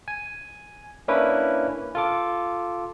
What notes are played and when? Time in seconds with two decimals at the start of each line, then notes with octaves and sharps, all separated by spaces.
0.08 G#5
1.08 A#3 C#4 D4 E4 B4
1.95 F4 A4 D6